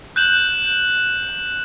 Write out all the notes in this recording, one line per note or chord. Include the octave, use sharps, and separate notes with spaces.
F#6 G6 E7 F#7